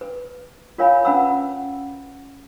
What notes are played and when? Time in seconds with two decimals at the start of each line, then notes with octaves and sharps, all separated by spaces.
0.01 B4
0.78 F4 A#4 C#5 F5 G#5 B5
1.05 C#4 B4 F#5 A#5 B5 E6